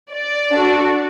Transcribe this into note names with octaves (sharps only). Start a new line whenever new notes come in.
D5
D4 F#4 A4